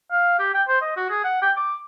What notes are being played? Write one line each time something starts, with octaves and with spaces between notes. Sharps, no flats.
F5
G4
G5
C5
D#5
F#4
G#4
F#5
G5
D6